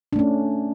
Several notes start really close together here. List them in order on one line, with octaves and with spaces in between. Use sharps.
D4 A3 C#4